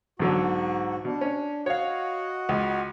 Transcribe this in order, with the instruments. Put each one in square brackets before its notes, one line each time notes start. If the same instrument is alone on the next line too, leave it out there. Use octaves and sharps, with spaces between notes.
[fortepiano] B1 D3 F#3 [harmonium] G#2 F#4
[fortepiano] B2 [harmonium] D4
[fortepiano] C#4
[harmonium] F#4 D#5 F#5 [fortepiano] C#5 F5
[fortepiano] C#2